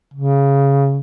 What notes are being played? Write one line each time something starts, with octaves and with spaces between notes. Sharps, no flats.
C#3